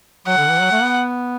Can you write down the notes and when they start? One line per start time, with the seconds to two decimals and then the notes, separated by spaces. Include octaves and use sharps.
0.26 F#3 F#5
0.38 D3
0.49 E3
0.60 F#3
0.71 A3
0.83 B3